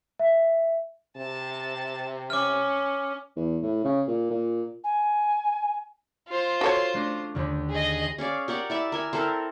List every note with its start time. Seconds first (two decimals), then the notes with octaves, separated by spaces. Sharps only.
0.19 E5
1.17 C3 A5
2.30 C#4 D6 F6
3.36 E2
3.62 A2
3.84 C#3
4.08 A#2
4.30 A#2
4.84 G#5
6.28 F4 C5
6.61 F#4 A4 C#5
6.94 A3 D4 A#6
7.35 D#2 D3 D#3
7.70 G#4 D#5
8.18 C#4 G#4 D5 F5
8.48 G4 A#4 D5 F#5
8.70 E4 D5 E5
8.92 A#4 E5 G#5
9.13 C4 E4 A4 A#4